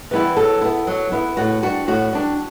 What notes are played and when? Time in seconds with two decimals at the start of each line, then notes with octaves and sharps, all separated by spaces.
0.11 E3 G3 B3 E4
0.36 F#3 A4
0.61 B3 E4
0.87 F#3
1.12 B3 E4
1.37 A2 F#4
1.63 G3 D4 F#4
1.87 A2 F#4
2.13 G3 D4